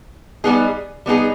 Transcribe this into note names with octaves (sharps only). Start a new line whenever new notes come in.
G3 B3 D#4 G#4
G3 B3 D#4 G#4